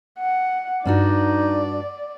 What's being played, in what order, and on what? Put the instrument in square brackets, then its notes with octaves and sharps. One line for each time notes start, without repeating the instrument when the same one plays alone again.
[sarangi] F#5
[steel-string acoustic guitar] G2 D4 F#4 [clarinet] D#4 [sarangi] D5